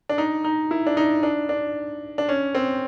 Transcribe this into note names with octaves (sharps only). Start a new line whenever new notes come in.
D4
D#4
D#4
E4
D4
D#4
D4
D4
D4
C#4
C4